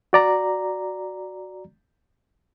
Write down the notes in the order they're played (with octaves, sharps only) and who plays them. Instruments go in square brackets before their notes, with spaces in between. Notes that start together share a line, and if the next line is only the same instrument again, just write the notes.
[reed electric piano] F#4 D5 A#5